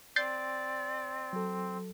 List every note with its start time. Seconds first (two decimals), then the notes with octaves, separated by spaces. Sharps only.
0.16 C4 D5 G6 A6 C7
1.33 F#3 A4